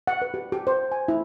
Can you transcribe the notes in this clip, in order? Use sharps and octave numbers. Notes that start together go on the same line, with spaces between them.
F#5
B4
G4
G4
C5
G#5
E4